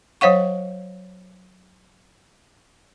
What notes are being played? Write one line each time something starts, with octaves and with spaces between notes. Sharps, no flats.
F#3 C5 C#5 F5 F#5 C#6